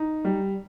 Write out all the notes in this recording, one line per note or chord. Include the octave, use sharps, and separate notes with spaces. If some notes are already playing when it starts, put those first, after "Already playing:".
Already playing: D#4
G3